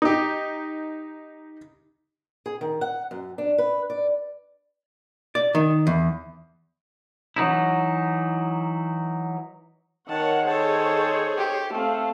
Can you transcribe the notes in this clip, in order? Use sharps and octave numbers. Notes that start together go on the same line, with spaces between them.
D#4 G4
G#4
D#3
F#5
F#2
D4
B4
D5
D5
D#3
E2
E3 F#3 D#4 E4
D#3 A#4 C#5 F#5 A5
G#4 A4 C5 C#5 A5
G4
A3 C4 F5